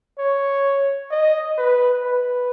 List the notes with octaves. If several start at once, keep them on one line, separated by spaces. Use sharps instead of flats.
C#5
D#5
B4
B4